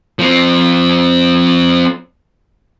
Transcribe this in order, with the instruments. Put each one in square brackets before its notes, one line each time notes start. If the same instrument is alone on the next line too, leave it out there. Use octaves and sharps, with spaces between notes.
[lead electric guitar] F3 C4